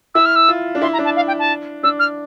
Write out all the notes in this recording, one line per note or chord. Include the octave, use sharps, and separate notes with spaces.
E4 E6
F6
E6
F4
D4
E4 C6
A#5
D4
A5
F5
G5
A5
D4 E6
F6